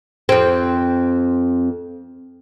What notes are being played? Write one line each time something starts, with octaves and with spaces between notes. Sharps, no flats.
F2 C4